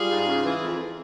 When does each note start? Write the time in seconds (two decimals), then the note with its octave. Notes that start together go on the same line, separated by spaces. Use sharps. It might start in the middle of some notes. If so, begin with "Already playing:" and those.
Already playing: G3 F4 G#4
0.10 G#2
0.27 C#3
0.44 E3
0.62 F2